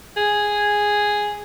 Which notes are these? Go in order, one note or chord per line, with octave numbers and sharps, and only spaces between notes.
G#4